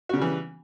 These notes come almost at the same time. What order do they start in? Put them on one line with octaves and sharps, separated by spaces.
F#4 C#3 G3 E3